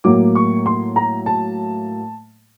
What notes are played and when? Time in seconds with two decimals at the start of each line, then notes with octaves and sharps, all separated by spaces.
0.04 A2 F#3 A#3 D6
0.35 C#6
0.66 C6
0.96 A#5
1.26 A5